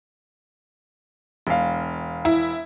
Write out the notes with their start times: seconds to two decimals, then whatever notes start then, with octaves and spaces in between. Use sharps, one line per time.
1.47 E1 F5
2.25 E4